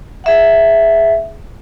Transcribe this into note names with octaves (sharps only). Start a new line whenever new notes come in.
G#4 E5 F#5